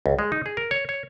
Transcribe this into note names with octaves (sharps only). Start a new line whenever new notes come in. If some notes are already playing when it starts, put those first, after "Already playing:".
C#2
G#3
D#4
G#4
A#4
C#5
C#5